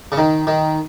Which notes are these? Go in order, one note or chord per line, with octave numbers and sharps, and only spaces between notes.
C#3
D#3
D#3